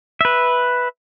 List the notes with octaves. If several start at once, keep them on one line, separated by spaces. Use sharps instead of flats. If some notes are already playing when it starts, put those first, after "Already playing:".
B4 E5